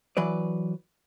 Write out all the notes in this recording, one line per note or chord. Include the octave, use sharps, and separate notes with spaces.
E3 F#3 B4 D5